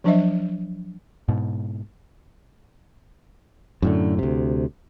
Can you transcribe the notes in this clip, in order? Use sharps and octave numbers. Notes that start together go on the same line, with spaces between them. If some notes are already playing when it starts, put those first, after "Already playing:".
F3 F#3 D4 C5 D#5 E5
G#2 B2
F#2 A2 D3
D2 C3